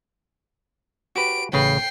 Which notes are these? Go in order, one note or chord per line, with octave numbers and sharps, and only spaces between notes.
F#4 G4 B4 D7
A1 C#3 B4 G5 C7